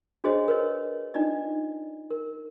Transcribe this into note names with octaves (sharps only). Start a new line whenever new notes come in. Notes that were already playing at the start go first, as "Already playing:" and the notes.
D4 F#4 G#4 C5 C#5 D#5
A#4 B4 C#5 D#5
D4 D#4 F4 D5 D#5
A#4